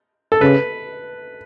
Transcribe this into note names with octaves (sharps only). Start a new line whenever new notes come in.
A4
C#3 B4